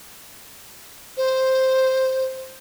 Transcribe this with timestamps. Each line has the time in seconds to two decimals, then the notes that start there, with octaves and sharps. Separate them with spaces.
1.17 C5